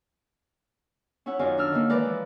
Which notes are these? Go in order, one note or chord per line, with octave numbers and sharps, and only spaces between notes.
C#4 E4 C#5 F#5
F#2 D#3 C#4 F4 D5 G#5
D4 E6 F6
D3 D#3 A#3
E3 G#3 A#4 B4 D5 D6
F3